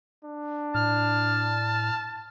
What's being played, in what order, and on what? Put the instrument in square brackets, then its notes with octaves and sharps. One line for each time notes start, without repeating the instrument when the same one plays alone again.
[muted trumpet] D4
[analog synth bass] A2 [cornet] A5 [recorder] F6